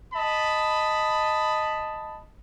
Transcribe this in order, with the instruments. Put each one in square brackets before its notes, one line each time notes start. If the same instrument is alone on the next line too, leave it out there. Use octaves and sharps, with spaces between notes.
[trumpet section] D#5 A5 B5